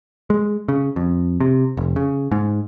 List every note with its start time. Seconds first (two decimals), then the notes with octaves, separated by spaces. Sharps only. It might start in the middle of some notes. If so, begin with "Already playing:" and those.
0.30 G#3
0.69 C#3
0.96 F2
1.40 C3
1.77 F1
1.96 C#3
2.31 G#2